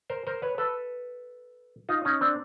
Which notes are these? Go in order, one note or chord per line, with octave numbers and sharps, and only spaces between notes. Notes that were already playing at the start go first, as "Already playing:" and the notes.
A#4 C5
A#4 C5
B4 C#5
A4 B4
D#4 F4
C#4 D#4
C4 D4